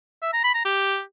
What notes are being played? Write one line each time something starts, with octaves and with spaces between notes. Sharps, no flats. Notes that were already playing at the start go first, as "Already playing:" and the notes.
E5
A#5
B5
A#5
G4